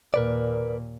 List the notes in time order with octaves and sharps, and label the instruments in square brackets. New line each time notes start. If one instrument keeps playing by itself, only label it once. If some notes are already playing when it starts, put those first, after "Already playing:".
[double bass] D#2 A#2 [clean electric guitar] A#4 B4 D5